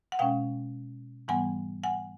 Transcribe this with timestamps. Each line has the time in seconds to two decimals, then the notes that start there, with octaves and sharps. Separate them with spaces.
0.12 F#5
0.19 B2 G#3 C#4 F5 G5
1.28 G#2 E3 G3 B3 F#5 G#5
1.83 F#5 G#5